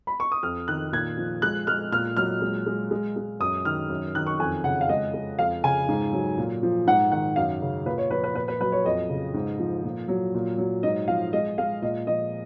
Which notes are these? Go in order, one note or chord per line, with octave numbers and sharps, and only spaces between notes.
B5
C#6
D#6
F2 F6
D#3 F#6
A#2 G#6
F3
G#3 F#6
G#3 F6
A#2 F6
F#3 F6
G#3
G#3
G#3
G#3
F#2 D#6
D#3 F6
F#2
D#3 F#6
C#6
F2 G#5
C#3 F#5
F5
G#3 D#5
G#3
F2 F5
C#3 G#5
G#2
F#3
A#2
F3
G#2 F#5
D#3 F#5
F#2 F5
C#3
A#2 B4
C#5
F3 B4
B4
A#2 B4
B4
F#3 B4
C#5
F2 D#5
C#3
G#2
F3
A#2
F#3
A#2
F#3
G#2 D#5
F3 F5
G#3 D#5
G#3 F5
A#2 D#5
F3 D#5